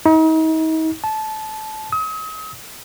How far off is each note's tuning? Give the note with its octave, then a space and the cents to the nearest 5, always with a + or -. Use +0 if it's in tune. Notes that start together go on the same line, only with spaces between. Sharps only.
D#4 +40
A5 -20
D#6 +40